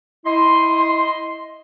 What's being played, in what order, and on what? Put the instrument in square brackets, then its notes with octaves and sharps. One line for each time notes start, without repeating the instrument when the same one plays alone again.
[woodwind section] E4 D#5 C6